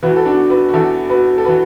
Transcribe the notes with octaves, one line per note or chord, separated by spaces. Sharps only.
E2 E3 F#4 B4
A4
D4 F#4
F#4 B4
F#4
E2 E3 E4 A4
F#4 B4
A4
E3 F#4 B4